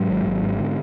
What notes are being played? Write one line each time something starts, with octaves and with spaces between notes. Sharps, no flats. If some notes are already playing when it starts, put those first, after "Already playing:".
Already playing: G#2 F#3
G#1
G#1
G#2
D3